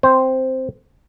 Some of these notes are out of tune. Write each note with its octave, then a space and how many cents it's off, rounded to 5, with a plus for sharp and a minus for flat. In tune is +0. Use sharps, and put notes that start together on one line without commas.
C4 +0 C5 +0